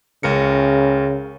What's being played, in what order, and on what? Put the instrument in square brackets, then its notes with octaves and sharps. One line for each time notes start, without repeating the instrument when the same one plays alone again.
[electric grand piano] C#2 A#4 C#7 [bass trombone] C#3